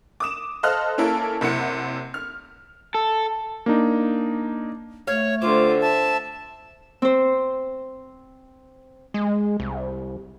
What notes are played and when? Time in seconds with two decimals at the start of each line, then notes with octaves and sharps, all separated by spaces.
0.20 D6 D#6 E7
0.63 A4 C5 D#5 F5 F6 F#6
0.98 A#3 C#4 E4 A4 A#4
1.41 F#1 C3 E4 F#5 C#7
2.14 F6
2.94 A4
3.66 A#3 D4 D#4
5.07 A3 C#5 F5
5.42 D3 C4 F4 D6
5.81 E5 A5
7.02 C4 C5
9.14 G#3
9.60 C2